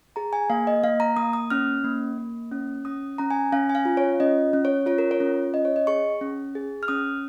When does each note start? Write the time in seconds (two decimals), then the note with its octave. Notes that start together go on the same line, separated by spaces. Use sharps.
0.16 G#4 A#5
0.33 G#5
0.50 A#3 F5
0.67 D#5
0.84 A#3 F5
1.00 A#5
1.17 A#3 D#6
1.33 D#6
1.50 C#4 F6
1.84 A#3
2.18 A#3
2.52 C#4
2.85 C#4 D#6
3.18 C#4 A#5
3.31 G#5
3.52 C#4 F5
3.69 G#5
3.75 F5
3.85 F4
3.97 C#5
4.20 C#4 D#5
4.53 C#4
4.65 C#5
4.86 F4 C#5
4.98 A#4
5.11 C#5
5.20 C#4
5.54 C#4 D#5
5.65 C#5
5.76 D#5
5.87 G#4 C#6
6.21 C#4
6.55 G#4
6.83 F6
6.88 C#4 D#6